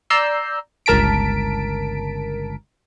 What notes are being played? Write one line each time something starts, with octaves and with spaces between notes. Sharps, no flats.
D5 A#5 E6 G6 C7
G1 C#2 A#4 A5 B6 D7